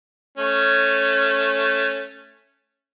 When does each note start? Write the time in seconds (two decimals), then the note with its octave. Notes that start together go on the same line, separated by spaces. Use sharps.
0.38 A3 C#4